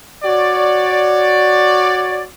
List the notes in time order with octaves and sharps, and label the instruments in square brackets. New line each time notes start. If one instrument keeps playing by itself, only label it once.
[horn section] F#4 C#5 D5